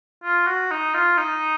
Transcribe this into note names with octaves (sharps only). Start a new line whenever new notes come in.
F4
F#4
D#4
F4
D#4